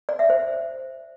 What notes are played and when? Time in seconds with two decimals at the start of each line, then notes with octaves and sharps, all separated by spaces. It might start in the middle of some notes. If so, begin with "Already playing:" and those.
0.09 D5
0.19 E5
0.30 C5